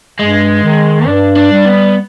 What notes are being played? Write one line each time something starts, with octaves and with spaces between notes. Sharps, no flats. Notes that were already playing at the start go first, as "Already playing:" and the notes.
G2 G#3
D#3
G2 D4
D4
G3
B3